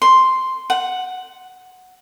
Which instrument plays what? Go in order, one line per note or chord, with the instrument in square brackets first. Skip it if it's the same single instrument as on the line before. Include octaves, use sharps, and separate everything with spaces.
[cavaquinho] C6
F#5